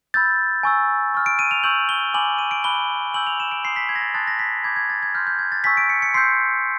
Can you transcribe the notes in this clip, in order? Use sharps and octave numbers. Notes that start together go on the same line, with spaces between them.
B5 E6 G6 A6
G#5 C#6 E6
C#6 F6
D7
D#7
F7
C#6 E6 G6 F#7
G7
G#5 B5 D6 F#7
D#7
D7
B5 D6 F#6 G7
G#5 C#6 E6 G6 F#7
F7
E7
D7
C6 D#6 G6 C7
B6
G#6
A#6
A6
A5 C6 D#6 F#6 A6
A#6
B6
B5 D6 G6 G#6
G#6
A6
G#6
C6 F6 G6
G6
G#6
A6
G#5 C#6 E6 G6 B6
D7
C#7
C#7
C6 E6 G6 C7